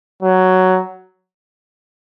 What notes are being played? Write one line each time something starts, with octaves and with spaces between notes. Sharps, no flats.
F#3